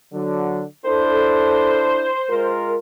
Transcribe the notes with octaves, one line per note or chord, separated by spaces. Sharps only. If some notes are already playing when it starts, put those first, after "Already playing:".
D3 F#3
D4 E4 A4 C5
G#3 F4 A#4